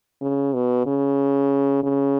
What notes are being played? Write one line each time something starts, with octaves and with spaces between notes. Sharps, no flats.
C#3
B2
C#3
C#3